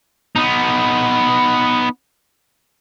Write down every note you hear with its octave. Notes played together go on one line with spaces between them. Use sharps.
B3 D#4